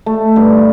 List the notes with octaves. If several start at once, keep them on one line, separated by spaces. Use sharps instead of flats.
A3
G2